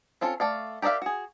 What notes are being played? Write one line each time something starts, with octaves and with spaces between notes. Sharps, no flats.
C4 C#4 F4 A4
A3 D5 F5
G4 A#4 D5 E5 F5
F#4 G#4